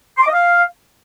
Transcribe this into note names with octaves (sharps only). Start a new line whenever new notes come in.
C6
D6
D#5
F5